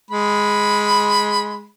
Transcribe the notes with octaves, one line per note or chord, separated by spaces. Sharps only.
G#3 B5